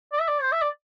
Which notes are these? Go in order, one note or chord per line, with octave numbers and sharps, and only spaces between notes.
D5
E5
D5
C5
E5
D5